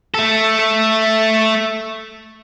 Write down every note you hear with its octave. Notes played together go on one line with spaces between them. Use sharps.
A3 A4